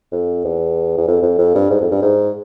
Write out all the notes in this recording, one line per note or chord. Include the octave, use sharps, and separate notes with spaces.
F2
E2
E2
F2
F2
F2
G2
G#2
F2
G2
G#2